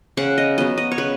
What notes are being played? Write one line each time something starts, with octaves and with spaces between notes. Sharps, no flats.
C#3 F#5
D#5
F#3 B3 D#5
D#5
C#5
C#3 B4